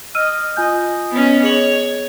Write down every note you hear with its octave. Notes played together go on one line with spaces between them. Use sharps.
D#5 E6 F6 D#7
F4 D#5 G#5 G6
B3 C#4
G#4 C#5 F#7